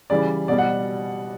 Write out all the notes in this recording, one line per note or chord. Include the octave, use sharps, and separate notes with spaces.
C#3 E3 G3 D5
B2 G3 D5
F#5